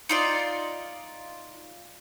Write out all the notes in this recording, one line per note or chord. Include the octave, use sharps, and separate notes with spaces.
D#4 F4 D5